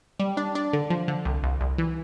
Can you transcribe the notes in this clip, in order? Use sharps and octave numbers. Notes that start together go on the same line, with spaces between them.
G3
D4
D4
D3
F3
D3
C2
C2
C2
E3